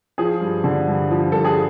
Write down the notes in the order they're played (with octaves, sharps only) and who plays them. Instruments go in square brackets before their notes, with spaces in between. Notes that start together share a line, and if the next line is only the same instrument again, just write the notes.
[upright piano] F3 G#4
G2
D3
G2
F3
G2 A4
G#4